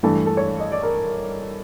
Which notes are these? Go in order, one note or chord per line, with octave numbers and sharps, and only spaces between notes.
G2 E3 A3 A4
A4
C#5
D#5
D5
A#4